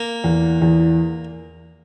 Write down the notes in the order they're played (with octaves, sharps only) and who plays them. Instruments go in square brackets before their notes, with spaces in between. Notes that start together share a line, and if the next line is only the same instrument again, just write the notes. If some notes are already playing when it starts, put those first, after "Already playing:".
Already playing: [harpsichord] A#3
[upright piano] E2
E2